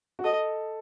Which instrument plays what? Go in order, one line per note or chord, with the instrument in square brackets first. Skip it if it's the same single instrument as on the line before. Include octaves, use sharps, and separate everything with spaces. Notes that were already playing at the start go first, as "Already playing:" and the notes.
[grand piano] F#4
[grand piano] A4 [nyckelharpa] D#5